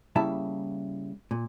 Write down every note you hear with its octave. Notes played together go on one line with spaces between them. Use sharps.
C#3 G3 A#3 E4 E5 A5
A#2